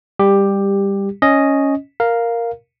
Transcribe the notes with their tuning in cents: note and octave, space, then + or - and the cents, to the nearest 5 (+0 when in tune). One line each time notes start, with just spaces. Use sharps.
G3 +20 G4 +10
C#4 +0 D#5 +0
A#4 +0 F5 +0